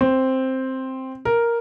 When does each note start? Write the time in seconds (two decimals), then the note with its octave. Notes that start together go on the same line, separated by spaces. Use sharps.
0.01 C4
1.25 A#4